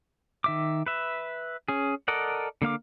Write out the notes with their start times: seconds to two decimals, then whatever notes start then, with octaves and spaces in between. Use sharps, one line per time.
0.44 D#3 E5 D6
0.86 B4 E5
1.68 C#4 G#4
2.08 A4 A#4 D5 D#5 F#5
2.62 D3 A#3 F5 D6